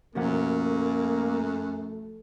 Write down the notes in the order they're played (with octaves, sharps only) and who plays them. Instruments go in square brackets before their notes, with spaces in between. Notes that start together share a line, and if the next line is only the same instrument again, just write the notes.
[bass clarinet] F#2 [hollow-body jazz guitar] B2 F3 F#5 [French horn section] A3 A4 [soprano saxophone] A#3